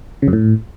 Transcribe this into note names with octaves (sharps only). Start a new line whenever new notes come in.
C#3
F#2
A2